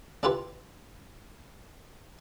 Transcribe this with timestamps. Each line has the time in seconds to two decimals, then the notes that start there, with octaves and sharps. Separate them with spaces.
0.23 D4 E4 F4 G4 B4